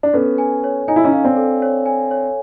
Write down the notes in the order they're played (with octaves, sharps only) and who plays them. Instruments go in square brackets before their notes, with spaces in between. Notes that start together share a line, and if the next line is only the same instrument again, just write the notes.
[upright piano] D4
[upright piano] B3 C#4 [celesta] A4
[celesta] G#5
C#5
[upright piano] D#4 [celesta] G#5
[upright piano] E4
C#4 D#4
[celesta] F5
[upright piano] C4 D4
[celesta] A4
C#5
G#5
C#5